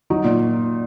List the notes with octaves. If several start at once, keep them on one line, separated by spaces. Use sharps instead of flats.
F#3 D#4
A#2